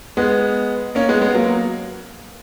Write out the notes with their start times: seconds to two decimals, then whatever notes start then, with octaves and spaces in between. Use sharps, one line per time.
0.17 G#3 B3
0.95 A#3 C#4
1.08 G#3 B3
1.21 G#3 B3
1.35 F#3 A#3